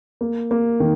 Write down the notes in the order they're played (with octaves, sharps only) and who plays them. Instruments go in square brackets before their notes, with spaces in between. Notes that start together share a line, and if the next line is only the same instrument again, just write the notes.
[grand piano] A#3
A#3
D#3